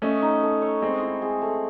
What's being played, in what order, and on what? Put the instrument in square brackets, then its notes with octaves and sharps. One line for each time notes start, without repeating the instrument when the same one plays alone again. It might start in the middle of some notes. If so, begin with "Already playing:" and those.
[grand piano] A3 C#4 [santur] D#5
[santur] D#4
A4
C#5
[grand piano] G#3 C4 [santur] D#5
[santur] E4
G#4
A3